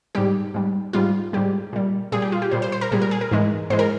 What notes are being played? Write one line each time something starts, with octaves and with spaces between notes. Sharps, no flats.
G#2 G3 G4
G#2 G3
G#2 G3 F4
G#2 G3 G4
A#2 G3
A#2 G3 G#4
G4
F4
G4
A#2 G3 C5
C5
C5
A#4
A#2 G3 G#4
A#4
G#4
A#4
G#2 E3 G#3
G#2 E3 G#3 C5
A#4